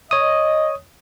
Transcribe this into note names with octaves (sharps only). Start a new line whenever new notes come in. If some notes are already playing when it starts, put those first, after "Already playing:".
C#5 D#5 D#6